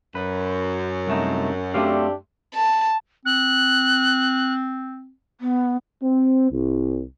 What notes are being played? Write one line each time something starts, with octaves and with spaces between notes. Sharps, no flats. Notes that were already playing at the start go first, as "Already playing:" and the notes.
F#2 B4
C2 A3 D#4
A3 C4 D4 G4 F5
A5
C4 F#6
B3
C4
C2